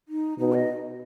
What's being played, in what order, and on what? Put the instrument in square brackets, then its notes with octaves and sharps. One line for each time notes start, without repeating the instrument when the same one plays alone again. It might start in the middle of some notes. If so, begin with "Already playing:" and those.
[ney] D#4
[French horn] B2 [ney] D#4
[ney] D#5